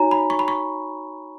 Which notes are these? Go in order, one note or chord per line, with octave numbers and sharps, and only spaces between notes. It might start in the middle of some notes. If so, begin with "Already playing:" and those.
Already playing: D#4 F#4 C#5 G#5 A#5
B5
C#6
B5
C#6